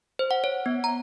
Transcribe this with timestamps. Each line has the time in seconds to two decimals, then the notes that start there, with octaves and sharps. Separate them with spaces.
0.19 C5
0.31 F#5
0.44 C#5
0.66 B3
0.84 A#5